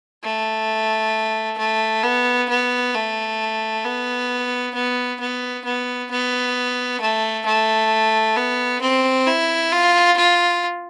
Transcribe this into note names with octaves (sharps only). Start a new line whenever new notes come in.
A3
A3
B3
B3
A3
B3
B3
B3
B3
B3
A3
A3
B3
C4
E4
F4
F4